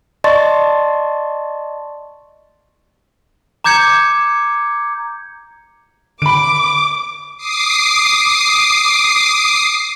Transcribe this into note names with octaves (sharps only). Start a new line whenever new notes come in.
D5 D#5 A5 C6 C#6 A6
A#5 D6 G6 G#6 C#7
D3 B5 D6 D7
D6 D#6 C7